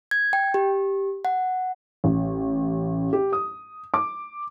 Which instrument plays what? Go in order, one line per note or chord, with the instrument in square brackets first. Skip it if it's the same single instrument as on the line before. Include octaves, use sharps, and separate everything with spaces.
[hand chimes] G#6
G5
G4
F#5
[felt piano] A1
G4
D#6
D6